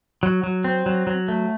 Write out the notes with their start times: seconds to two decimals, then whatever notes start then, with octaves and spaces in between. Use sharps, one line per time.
0.23 F#3
0.44 F#3
0.64 C4
0.86 F#3
1.07 F#3
1.28 A3